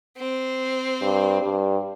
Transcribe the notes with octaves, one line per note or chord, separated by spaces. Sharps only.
C4
G2
G2